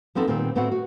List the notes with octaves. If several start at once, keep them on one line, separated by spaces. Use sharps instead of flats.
F3 B3 C4 D#4 A4
A#2 D#3 G3 B3 C4
A2 B3 C4 E4 F#4 F#5
F#4